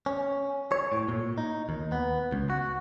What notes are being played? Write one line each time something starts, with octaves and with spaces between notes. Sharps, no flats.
C#4
C#5
A2
A#2
D#4
D#2
B3
C#2
F#4